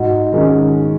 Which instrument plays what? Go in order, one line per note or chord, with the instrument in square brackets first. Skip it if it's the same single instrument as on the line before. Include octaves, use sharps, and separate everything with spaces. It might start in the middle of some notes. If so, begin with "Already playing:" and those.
Already playing: [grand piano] G#2 F#4
D#3 G#3 C#4